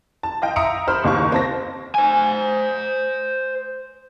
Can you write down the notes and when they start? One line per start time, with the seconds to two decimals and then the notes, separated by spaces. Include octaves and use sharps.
0.23 A5
0.42 D#5 F5 G5
0.56 E5 A#5 D#6 C#7 D7
0.88 C5 B5 F6
1.04 F#1 D#2 F5 C#6
1.32 C4 A5 A#6
1.95 C5 G#5